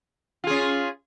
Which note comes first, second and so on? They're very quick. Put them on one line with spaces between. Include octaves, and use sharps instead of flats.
F4 G#4 C#4